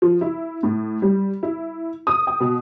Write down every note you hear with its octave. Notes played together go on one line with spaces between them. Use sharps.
F3
E4
A2
G3
E4
D#6
G5
B2